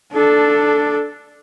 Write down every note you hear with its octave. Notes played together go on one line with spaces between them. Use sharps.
D4 A4